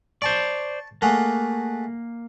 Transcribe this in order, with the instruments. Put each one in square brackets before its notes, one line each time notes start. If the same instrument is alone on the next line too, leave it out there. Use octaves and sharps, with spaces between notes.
[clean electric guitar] C5 D5 [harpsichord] A5 C#6
[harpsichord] A3 F#4 G#4 [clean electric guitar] A#3